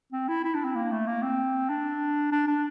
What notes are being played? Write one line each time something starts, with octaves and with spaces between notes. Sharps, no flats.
C4
E4
E4
D4
C4
A#3
A3
A#3
C4
D4
D4
D4